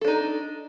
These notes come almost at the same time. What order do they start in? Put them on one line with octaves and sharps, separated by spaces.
A4 D4 D#4